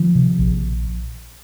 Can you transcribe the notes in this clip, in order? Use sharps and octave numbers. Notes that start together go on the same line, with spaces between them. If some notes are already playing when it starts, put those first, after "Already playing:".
Already playing: D#3 F3
C3
A#1